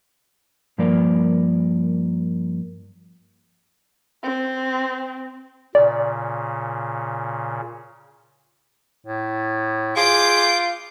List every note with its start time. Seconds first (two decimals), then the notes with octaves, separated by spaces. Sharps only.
0.78 G2 F3 A#3 A#4 D5
4.23 C4
5.75 A#2 C#3 D5
9.07 A2
9.97 F4 G#4 D6 G6